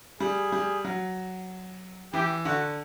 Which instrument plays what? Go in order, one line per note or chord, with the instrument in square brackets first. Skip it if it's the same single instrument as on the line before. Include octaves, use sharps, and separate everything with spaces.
[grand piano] G3 [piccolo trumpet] G#4
[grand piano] G3
F#3
[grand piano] E3 [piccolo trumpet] G4
[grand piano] D3 [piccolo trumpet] F#4